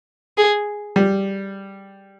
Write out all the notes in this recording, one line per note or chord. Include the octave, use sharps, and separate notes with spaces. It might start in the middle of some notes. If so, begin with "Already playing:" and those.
G#4
G3